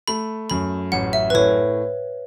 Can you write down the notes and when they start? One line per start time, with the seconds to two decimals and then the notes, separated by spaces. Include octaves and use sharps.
0.08 A3 B5
0.50 F#2 B5
0.92 A1 F#5
1.13 E5
1.30 B4
1.34 A2 C#5